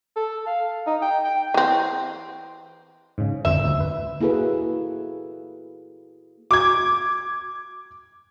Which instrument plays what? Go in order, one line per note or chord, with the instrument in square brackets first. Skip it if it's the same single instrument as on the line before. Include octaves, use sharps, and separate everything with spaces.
[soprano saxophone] A4
F5
D#4
G5
G5
[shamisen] E3 C4
[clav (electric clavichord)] G#2 C#3
[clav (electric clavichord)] G1 F2 C5 [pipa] E5
[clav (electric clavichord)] D2
B4
[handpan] A#3 E4 F#4 G#4 A4 B4
[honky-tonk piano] D6 G#6